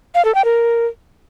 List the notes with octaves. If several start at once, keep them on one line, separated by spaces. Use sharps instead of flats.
F5
A4
G5
A#4